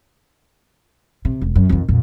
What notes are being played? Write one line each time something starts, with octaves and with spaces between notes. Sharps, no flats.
C3
E1
F#2
F2 D#3
F2 A#2